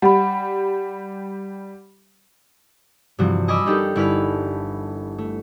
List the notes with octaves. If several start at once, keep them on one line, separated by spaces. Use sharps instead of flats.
G3 F#5 B5
G2 C3 E3 F3 F#4
D#5 G#5 B5 D6 E6
D4 D#4 G4 A4 A#4
G1 E4 B4 F6 B6
A3